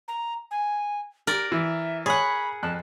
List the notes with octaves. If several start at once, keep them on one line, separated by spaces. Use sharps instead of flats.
A#5
G#5
G4 A#4 D5 A#5
E3 E5
G#4 C#5 F#5 B5
F2 A5 F#6